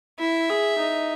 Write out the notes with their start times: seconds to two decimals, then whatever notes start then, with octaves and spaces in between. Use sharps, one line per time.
0.19 E4 E5
0.50 G#4
0.78 D#4